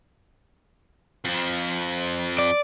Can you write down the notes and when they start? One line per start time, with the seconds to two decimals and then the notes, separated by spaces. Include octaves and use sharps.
1.25 F2 F3
2.39 D5